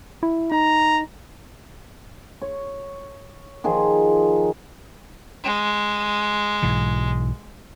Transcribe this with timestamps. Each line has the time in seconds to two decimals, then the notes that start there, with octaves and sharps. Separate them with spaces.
0.23 E4
0.52 D#4 A#5
2.42 C#5
3.64 D#3 F3 G#4
5.44 G#3
6.63 B1 G#2 E3